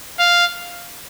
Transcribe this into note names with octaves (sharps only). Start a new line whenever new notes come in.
F5